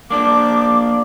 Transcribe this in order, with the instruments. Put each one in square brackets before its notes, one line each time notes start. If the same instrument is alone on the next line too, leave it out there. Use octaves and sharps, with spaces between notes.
[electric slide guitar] A#3 D4 [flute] D6